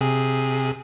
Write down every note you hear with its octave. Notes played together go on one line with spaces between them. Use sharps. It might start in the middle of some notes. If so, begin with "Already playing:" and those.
C3 G#4